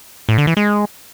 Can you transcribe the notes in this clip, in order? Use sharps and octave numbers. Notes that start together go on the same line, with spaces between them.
A2
D3
E3
G#3